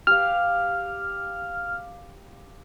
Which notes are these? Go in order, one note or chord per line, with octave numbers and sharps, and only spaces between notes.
G4 F5 F6